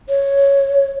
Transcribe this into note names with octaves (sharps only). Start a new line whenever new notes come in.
C#5